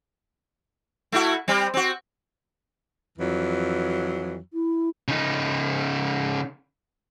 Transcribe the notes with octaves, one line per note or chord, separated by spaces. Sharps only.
A3 E4 F#4
G3 C4
C4 F#4
F2 E3 F#3
E4
C#3 D#4